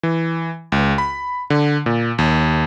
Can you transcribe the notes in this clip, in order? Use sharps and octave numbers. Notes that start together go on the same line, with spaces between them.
E3
C#2
B5
D3
A#2
D#2